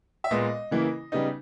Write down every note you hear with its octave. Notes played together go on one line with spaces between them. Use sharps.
E5
A#2 G#3 B3 D#5
C#3 E3 A#3 E4
C#3 G3 B3 D#4